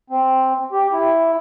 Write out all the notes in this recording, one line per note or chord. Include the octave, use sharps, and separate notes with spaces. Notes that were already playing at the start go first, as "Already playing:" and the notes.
C4
G4
E4